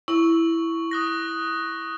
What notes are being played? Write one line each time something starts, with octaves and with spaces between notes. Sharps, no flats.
E4 C#6 F#7
D#6 F#6 A#6